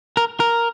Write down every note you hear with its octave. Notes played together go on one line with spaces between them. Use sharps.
A#4
A#4